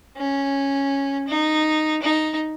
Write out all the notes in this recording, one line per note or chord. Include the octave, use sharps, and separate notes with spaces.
C#4
D#4
D#4